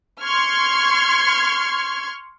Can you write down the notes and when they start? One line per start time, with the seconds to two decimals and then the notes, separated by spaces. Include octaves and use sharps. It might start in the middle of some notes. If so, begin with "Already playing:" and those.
0.23 C6 C#6 F6 G#6